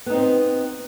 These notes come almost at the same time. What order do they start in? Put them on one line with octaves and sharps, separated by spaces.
B3 D#4 C4